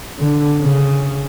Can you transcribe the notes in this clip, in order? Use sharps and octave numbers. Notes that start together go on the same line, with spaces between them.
D3
C#3